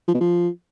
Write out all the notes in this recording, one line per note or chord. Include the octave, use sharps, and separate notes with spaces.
F3
B2
F3